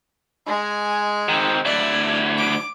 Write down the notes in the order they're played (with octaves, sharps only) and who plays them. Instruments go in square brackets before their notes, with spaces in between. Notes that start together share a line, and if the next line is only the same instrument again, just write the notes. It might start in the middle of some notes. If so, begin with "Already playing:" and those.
[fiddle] G#3 G#5
[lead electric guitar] D#3 C4
[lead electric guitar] D2 E4 [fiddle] D5
[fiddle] D6